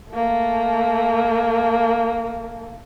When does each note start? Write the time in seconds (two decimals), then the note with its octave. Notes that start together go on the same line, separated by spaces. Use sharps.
0.13 A3 A#3